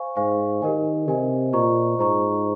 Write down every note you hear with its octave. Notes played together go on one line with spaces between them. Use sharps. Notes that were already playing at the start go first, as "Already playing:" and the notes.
Already playing: C5 F5 G#5 C#6
G#2 C5 F5 G#5 C#6
D#3 G4 A#4 D#5 G#5
C3 G4 A#4 D#5 G#5
A#2 F4 C5 D#5 A#5 C#6
G#2 F4 C5 D#5 A#5 C#6